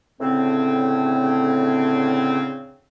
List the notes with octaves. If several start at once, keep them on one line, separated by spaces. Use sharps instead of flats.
D2 A2 C#3 C4